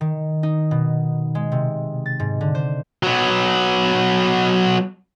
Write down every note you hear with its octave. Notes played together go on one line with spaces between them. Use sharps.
D#3
D#4
B2
G#3
C3
A6
G#2
D3
C5
F#3 B3